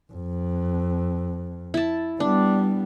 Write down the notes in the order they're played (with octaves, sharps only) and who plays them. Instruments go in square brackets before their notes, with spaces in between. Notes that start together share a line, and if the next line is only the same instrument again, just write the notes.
[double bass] F2
[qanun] E4 A5
[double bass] G3 B3 [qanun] D4